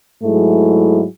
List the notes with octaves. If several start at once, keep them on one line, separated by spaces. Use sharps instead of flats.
G#2 F#3 A3 E4 G#4